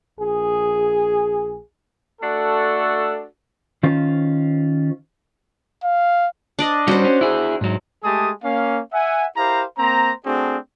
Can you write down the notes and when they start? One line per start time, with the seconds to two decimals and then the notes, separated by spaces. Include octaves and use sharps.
0.19 A#1 G#4
2.22 A3 D4 F#4 A4
3.83 D#3 C#4 F4 C5
5.84 F5
6.59 D4 D5 D#5
6.88 G3 C#4 F#4 C5
7.05 C#4
7.21 E4 G#4
7.61 G#2 F#3
8.04 G#3 A3 G4 G#4 A5 D#6
8.44 A#3 C#4 F5
8.92 E5 F#5 G#5
9.37 E4 G4 A#4 C5 F5 A#5
9.78 A#3 C4 C5 A#5
10.25 A3 C4 D4 F#4 G#4